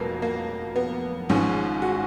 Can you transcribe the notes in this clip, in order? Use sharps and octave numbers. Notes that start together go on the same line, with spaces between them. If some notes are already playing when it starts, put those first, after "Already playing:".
Already playing: F1 F2 F#3 A#3 B3
A#3
B3
G#1 G#2 F3 C#4
F#4